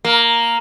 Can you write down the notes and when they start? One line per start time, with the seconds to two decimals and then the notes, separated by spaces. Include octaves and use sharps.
0.05 A#3